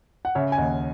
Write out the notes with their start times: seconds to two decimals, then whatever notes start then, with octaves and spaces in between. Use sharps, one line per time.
0.25 F#5
0.35 C#3 C#5 E5
0.52 G#5
0.58 D#2 D#5 F#5